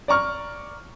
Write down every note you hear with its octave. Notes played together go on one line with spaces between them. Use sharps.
D5 A#5 C#6 F6